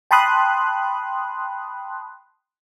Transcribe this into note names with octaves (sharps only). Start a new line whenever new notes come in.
G5 A5 B5 C6 D#6 F#6